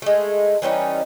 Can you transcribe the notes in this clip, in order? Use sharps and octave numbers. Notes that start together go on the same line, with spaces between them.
G#3 A3
E3 G3 C#4 D#4